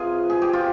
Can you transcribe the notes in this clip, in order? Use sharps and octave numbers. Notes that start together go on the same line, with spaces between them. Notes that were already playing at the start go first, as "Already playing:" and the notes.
Already playing: C3 F4 G#4 B4
G#4
G4
F4